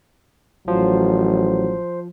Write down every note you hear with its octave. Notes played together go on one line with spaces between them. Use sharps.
A1 F3 F#3 C5